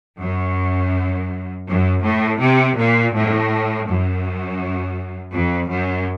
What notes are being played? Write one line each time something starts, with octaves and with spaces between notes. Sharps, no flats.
F#2
F#2
A2
C3
A#2
A2
F#2
F2
F#2